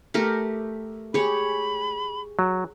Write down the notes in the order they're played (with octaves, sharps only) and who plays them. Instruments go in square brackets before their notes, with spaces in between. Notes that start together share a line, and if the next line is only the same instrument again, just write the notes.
[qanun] A3 G4 A#4
[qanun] G4 C#5 [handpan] G#4 [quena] B5
[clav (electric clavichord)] F#3